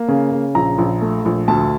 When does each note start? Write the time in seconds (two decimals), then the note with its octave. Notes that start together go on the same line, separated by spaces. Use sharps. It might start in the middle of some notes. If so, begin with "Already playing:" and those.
Already playing: A#3
0.08 C#3
0.31 C#3
0.55 A#1 A#5
0.78 A#1
1.01 A3
1.25 A#1
1.48 D2 A5